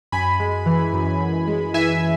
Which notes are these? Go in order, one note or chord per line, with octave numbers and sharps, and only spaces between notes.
F#2 G#5 B5
G#3
E3
F#2
F#2
G#3
E3 E5 G#5